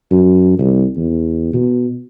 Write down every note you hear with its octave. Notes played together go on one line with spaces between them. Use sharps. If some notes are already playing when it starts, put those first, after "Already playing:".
F#2
C2
E2
B2